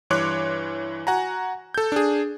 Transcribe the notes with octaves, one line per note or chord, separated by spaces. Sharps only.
G2 E3 C#5 C6 D6 F#6
F#4 F#5 G#5 A#5
A4 G6
D4 G#4